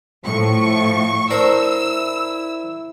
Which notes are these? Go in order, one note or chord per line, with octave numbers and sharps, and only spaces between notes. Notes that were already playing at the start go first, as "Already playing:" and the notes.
A2 F3 C#6
D4 E4 A#4 C5 E6